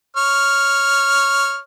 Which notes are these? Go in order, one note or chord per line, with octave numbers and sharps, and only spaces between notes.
C#5 F6